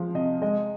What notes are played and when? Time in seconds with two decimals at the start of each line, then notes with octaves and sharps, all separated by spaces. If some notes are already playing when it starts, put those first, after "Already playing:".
Already playing: F3 G#3 F5
0.15 C3 D#5
0.42 G#3 D#5